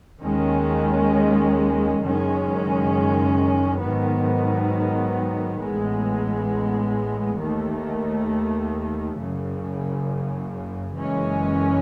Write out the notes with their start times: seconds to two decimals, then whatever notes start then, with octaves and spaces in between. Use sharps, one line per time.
0.22 D#2 D#3 G#3 C#4
2.01 F#1 F#2 D#3 G#3 C#4
3.80 G#2 D#3 F#3 B3
5.59 A1 A2 G#3 B3
7.37 D#2 D#3 A3
9.16 F#1 F#2 C#3
10.95 F#1 F#2 E3 G#3 C#4